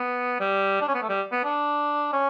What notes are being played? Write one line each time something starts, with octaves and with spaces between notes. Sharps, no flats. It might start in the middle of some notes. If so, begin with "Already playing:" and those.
Already playing: B3
G3
D4
C#4
B3
A3
G3
B3
D4
C#4